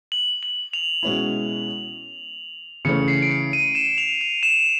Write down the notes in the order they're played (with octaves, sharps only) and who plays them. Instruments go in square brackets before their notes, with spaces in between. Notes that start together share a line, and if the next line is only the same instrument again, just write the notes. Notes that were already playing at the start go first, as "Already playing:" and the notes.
[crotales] F#7
F#7
F7
[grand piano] B2 G#3 C#4 E4
[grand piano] C#3 E3 A3 C#4 [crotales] C#7
[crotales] C7
D7
C#7
D#7
E7
F7
F7
E7